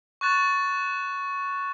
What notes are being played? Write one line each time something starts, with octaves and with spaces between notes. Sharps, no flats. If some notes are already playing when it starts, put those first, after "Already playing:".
C#6 F#6 A6 E7